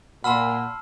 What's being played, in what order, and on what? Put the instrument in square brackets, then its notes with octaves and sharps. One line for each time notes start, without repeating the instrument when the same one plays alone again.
[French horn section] A#2 [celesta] F#5 [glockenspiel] A5 E6 F6 [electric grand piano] B5 C6